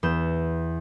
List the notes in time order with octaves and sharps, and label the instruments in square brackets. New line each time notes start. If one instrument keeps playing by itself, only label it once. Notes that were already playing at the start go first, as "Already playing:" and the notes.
[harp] E2 B3 G6 E7